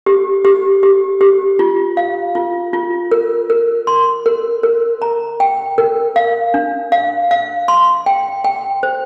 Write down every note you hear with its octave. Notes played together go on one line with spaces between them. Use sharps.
G4
G4
G4
G4
F4
F5
F4
F4
A#4
A#4
C6
A#4
A#4
A#5
G5
A#4
F5
D4
F5
F5
C6
G5
G5
C5